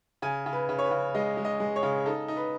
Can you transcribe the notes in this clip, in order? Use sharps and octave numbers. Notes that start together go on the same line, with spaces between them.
C#3 G#5
C#3
B4
C#3
C#5
B4
C#3
G#3 D#5
G#3
D#5
G#3
C#5
C#3
D#4 A4
D#4
B4